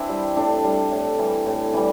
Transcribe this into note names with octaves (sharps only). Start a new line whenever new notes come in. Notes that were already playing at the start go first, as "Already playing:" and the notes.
Already playing: E3 C4 D4 E4
G3
A2 D4
G3
A2
E3 G3
A2
E3 G3